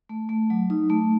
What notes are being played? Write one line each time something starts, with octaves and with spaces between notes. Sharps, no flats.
A3
A3
F#3
D#4
A3